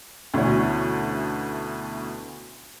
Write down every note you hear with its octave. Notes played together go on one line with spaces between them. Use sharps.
D2 B2 E3 C#4